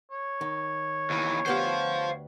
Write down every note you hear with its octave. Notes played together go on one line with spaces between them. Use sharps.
C#5
D#3
D#2 E3
D2 B3 G4 C5 F5